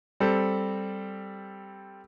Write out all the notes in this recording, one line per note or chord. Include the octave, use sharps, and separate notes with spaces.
G3 C4 A4